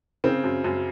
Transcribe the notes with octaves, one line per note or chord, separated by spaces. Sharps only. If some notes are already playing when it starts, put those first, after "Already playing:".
C#3 C4
F#2
F#2